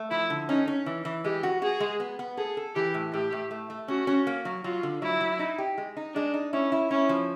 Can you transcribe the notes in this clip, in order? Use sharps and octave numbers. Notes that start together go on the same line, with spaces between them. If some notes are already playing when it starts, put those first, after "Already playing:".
Already playing: A3
F3 E4
D3
C#4 D#4
C#4
E3
E3
G#3 G4
F#4
F#4 G#4
G#3
B3
B3
G#4 A4
A4
E3 G4
A2
A2 G4
A2
A3
A3
C#4 F#4
C#4
A#3
F#3
F#3 F4
D3
F#3 E4
F#3
D#4
G4
G#3
D#4
G#3 D4
D#4
C#4 E4
E4
C#4 E4
F3